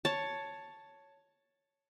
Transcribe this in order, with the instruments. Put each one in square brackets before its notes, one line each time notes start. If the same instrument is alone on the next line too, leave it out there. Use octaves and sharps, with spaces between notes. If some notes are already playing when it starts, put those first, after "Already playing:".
[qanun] C#5 A5